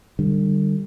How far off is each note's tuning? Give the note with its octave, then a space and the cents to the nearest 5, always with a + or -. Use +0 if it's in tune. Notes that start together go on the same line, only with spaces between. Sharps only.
D3 +40 G3 +0